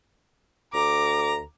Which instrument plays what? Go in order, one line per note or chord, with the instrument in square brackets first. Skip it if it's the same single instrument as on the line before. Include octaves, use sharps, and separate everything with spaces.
[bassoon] D2 [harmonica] A#5 [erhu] D6